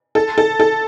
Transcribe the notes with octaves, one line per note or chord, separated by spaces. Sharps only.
A4
A4
A4